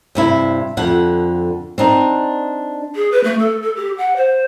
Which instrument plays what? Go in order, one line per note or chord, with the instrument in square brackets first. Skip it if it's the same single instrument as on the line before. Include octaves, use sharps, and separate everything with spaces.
[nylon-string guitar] G2 C3 E4
F2 D3 F#5
C4 D4 D#4
[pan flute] G#4
B4
A3
A4
A4
G4
F#5
C5